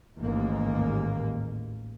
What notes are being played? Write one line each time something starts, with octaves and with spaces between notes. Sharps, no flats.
A1 D#2 G#2 A#3